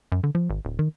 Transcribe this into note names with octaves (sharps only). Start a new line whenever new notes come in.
F#2
D3
F3
G#1
D1
D#3